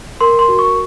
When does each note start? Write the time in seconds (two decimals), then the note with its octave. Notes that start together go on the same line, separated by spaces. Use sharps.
0.21 A#4 C6
0.39 C6
0.49 F#4
0.59 C#6